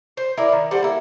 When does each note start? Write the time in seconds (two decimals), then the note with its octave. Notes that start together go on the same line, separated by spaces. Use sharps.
0.17 C5
0.37 E4 A#4 D5
0.52 D#3
0.71 G3 A4 C5 F#5
0.83 A#3 E4